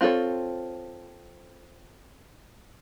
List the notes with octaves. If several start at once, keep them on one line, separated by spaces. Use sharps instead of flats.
C4 F4 G#4 A4 C#5